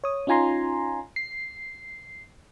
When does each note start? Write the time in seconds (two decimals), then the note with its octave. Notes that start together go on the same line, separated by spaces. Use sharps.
0.04 C#5 D#6
0.27 C#4 D#4 F4 G#5 A#5 C6
1.16 C7